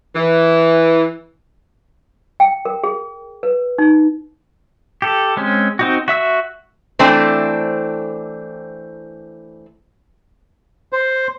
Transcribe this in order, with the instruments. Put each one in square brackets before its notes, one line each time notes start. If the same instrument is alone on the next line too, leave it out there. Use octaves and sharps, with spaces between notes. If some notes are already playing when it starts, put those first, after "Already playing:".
[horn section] E3
[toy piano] G5
A#4
G#4
B4
D#4
[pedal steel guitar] G4 A4
G#3 C4 C#4
C4 D#4 F#4
F#4 E5 E6
[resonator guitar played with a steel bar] E3 A3 C4 D4 C5
[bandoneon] C5